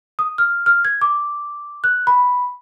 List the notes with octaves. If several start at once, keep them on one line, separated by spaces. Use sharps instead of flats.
D#6
F6
F6
G#6
D6
F#6
B5